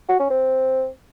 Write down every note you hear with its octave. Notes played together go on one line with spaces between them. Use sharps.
F#4
C#4
C4